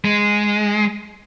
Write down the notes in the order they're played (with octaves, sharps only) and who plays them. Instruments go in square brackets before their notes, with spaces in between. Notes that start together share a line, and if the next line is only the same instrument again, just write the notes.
[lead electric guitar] G#3